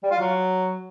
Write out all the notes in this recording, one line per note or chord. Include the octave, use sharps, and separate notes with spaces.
G3
F4
F#3